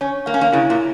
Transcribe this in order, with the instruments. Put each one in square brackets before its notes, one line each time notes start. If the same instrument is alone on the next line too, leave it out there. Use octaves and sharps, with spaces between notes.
[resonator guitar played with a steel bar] C#4 [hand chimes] C#5
[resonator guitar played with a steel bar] A#3 [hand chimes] F5
[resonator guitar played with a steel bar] C#4
A#3
[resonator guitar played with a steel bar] C#3 [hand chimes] E4
[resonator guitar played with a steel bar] A#2